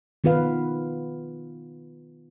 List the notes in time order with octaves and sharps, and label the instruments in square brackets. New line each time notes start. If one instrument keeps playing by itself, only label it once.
[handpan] D#3 B3 F4 B4 F5